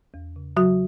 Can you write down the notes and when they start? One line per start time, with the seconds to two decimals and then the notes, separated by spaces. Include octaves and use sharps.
0.14 E2
0.36 C#3
0.57 C#3 F#3 F#4